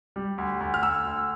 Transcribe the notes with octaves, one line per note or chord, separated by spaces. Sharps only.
G3
D2
D2
F6
D2 E6
D2